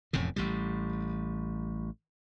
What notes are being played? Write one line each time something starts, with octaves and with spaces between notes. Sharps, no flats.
E1 F2 A2 C#3
A1 A2 G3